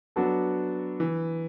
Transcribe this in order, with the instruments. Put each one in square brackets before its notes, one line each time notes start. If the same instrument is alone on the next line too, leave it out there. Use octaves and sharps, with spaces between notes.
[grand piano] F#3 B3 D4 F#4 A4
E3